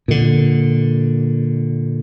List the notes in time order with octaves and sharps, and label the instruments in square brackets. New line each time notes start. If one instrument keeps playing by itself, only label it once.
[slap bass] A#2 D3